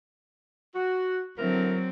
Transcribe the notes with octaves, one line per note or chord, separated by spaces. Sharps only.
F#4
D3 F#3 C4 E4 A#4